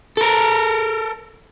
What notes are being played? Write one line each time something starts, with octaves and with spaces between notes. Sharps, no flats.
A4 A#4